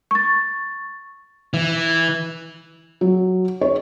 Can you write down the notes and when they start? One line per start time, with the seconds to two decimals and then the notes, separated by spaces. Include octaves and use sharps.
0.11 C#6 A6
1.54 E3
3.01 F#3
3.61 C#5